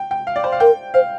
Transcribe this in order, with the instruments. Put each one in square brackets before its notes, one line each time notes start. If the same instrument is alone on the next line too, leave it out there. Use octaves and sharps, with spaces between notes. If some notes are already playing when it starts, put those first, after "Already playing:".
Already playing: [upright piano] G5
G5
F5
D5
C5
F5
[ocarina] A#4 [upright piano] G5
[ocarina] C5 [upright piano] F5